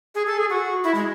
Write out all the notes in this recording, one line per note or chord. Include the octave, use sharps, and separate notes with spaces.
G#4
A4
G#4
F#4
E4
G#3